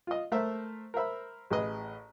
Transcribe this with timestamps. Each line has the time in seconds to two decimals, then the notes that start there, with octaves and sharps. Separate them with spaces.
0.07 F4 D#5
0.32 A3 A#4 C5 E5
0.94 A#4 C5 E5 B5
1.50 A1 G#4 B4 D#5